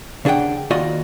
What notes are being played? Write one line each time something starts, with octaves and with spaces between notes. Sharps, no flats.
C#3 D4 G#4 F#5 G5
D#2 F4 F#4 D5 D#5